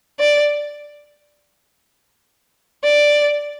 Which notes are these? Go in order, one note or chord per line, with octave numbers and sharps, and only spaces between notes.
D5
D5